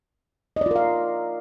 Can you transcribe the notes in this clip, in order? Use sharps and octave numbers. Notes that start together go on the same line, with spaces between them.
F4 A#4 D5 D#5 F5